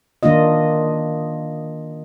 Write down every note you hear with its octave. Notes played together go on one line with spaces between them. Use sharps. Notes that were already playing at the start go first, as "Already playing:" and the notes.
D#3 A#3 D4 F4 D#5